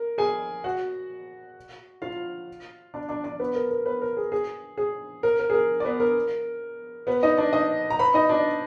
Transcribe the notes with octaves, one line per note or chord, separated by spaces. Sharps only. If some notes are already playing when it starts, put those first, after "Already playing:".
Already playing: A#4
G#4 G#5
F#4 F#5
F4 F5
D4 D5
D4 D5
D4 D5
B3 B4
A#4
A#4
B3 B4
A#4
G#4
G#4
G#4
A#4
A#4
G#4
A#4
D5
B3 B4
A#4
B3 B4
D#4 D#5
D4 D5
D#4 D#5
A#5
B4 B5
D#4 D#5
D4 D5